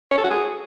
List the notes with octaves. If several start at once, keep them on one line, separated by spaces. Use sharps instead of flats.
C#5
A4
F#4
G#4